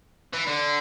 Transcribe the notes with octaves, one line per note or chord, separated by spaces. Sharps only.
E3
D3